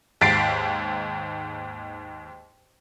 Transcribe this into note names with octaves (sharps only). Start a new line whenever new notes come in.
D#2 G#2 A6 B6 C7 D7